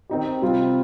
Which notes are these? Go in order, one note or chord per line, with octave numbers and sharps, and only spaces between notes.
D#3 C4 D#4 G4
C3 G3 C4 F4